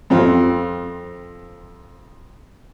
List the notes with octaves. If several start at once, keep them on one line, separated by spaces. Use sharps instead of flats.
F2 C4 F4